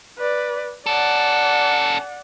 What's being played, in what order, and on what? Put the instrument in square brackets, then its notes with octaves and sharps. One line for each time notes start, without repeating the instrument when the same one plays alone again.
[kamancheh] B4 D5
[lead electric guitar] C#4 A4 [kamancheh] D5 F#5